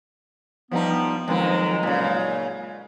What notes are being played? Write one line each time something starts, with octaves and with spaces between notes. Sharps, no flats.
F3 G3 B3 D#4
F2 B2 D#3 F#3 G#3
A#2 C#3